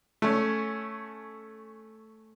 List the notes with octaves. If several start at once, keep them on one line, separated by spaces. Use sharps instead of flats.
A3 C#4